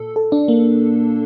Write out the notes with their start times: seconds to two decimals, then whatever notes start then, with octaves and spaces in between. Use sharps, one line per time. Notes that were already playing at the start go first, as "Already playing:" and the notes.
Already playing: A#2 A4
0.16 A4
0.32 D4
0.48 A#3